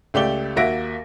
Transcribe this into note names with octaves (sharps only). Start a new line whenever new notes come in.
C#2 A3 G4 D5 G7
D#2 A#3 F#4 E5 A#6 D7